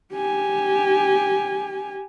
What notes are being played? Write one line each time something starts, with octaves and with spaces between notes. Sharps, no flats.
G4 G#5